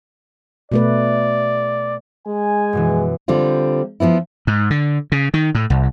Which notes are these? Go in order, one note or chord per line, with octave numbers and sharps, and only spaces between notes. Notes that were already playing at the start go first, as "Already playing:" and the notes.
B2 A3 B4 D5
G#3 G#5
F#2 B2 E3
D3 G3 C4 F4
F3 F#3 B3 E4
G#2
D3
C#3
D#3
A2
C2